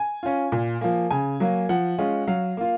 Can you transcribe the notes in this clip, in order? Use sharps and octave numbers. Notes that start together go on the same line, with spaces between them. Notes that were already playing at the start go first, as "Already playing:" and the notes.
Already playing: G#5
C#4 F4
A#2
F3 A#3
C#3 G#5
F#3 A#3
F3 F#5
G#3 C#4 F4
F#3 F5
A#3 F4